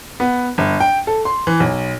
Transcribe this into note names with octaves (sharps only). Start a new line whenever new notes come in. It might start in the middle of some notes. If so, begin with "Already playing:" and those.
B3
G1
G5
A4
C6
E3
B1